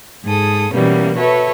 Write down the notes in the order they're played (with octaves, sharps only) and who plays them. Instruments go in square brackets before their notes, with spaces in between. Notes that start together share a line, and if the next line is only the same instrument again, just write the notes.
[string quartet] G#2 G#4 A4 D#6
B2 E3 G3 A#3 B3 C#4
F#4 A4 B4 C#5 E5